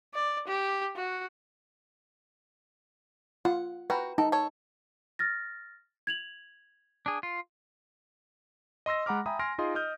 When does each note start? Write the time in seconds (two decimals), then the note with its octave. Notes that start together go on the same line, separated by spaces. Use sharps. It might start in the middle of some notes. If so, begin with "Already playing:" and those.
0.14 D5
0.47 G4
0.95 F#4
3.45 F4 F#5
3.90 F#4 B4 G5 A#5
4.18 D#4 A4
4.32 A4 C#5
5.19 F6 A6 A#6
6.07 G#6 F7 F#7
7.06 D4 G#4
7.23 F4
8.86 D#5 C6 E6 A#6
9.06 G#3 F#5 A#5 B5 D6 F6
9.26 E5 G5 G#5 A#5 B5 D#6
9.39 G#5 C6 F6 A#6 D7
9.58 D#4 F4 G#4 D#5 C6
9.75 D#5 D#6 F6 G6